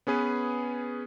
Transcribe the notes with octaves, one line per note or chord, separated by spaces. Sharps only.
B3 C#4 G#4 B4